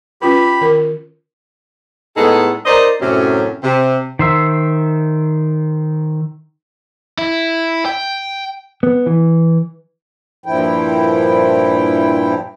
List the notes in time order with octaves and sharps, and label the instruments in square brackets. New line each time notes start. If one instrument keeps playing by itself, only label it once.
[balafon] C#4 F4 B4 [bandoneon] G4 B5
[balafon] D#3 A#4
[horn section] A2 G#3 B3 D#4 G#4 A4
D#4 A#4 C5 D5 D#5
F#2 A2 C3 F#3 C#4
C3
[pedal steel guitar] D#3 C5 E5
[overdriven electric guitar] E4
G5
[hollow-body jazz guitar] B3
E3
[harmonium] G2 A#2 F3 E4 G5